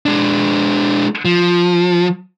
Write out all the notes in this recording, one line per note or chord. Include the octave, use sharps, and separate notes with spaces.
G#3 D4
F3